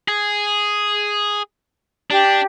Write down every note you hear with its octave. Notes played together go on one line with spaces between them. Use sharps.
G#4
D4 G4